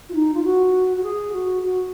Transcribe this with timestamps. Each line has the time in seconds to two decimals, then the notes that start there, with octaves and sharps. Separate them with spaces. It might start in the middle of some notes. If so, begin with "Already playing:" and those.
0.09 F4
0.14 D#4
0.34 F4
0.44 F#4
0.97 F#4
1.03 G#4
1.33 F#4
1.63 F#4